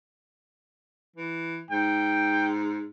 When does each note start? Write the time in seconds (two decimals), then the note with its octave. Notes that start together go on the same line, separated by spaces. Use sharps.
1.16 E3
1.70 G#2 G5